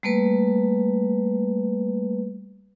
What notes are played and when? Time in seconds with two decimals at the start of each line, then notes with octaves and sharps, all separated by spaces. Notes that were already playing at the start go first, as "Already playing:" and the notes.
0.03 G3 A3 A#3 B4